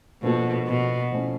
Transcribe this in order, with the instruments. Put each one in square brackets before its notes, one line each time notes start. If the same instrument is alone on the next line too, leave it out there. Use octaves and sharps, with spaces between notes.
[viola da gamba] B2 [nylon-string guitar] F3 A#3 D4 F#4 A4
[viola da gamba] B2
[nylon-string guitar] F3 A3 C#4 E4